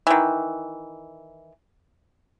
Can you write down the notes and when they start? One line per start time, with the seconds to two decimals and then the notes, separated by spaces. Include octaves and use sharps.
0.07 D#3 E3